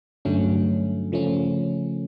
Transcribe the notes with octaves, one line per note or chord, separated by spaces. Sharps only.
G2 D3 F#3 A3 C#4
C#3 F3 A3 C#4